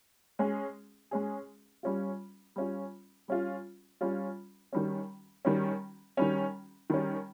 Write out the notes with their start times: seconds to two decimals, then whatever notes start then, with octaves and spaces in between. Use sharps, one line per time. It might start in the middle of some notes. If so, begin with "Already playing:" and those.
0.39 G#3 C#4 G#4
1.11 G#3 C#4 G#4
1.83 G3 C#4 F4
2.56 G3 C#4 F4
3.28 G3 C#4 F4
4.01 G3 C#4 F4
4.73 D#3 G3 C#4
5.45 D#3 G3 C#4
6.17 D#3 G3 C#4
6.90 D#3 G3 C#4